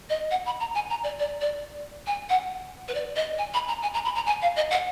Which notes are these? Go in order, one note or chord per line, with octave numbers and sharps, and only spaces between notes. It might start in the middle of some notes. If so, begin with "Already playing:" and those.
D#5
F#5
B5
A#5
G#5
A#5
D5
D5
D5
G#5
F#5
B4
D5
D#5
G#5
B5
A#5
G#5
A#5
B5
A#5
G#5
F5
D#5
F#5